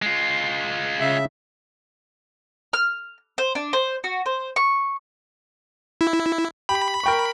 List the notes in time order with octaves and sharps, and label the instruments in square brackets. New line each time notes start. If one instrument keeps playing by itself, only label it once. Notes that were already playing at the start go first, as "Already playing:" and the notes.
[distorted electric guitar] G#3 F4
[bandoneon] C#3 E5
[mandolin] F6
C5
D4
C5
F#4
C5
C#6
[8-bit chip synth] E4
[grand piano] G4 [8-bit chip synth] B5
[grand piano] A#4 G5 C#6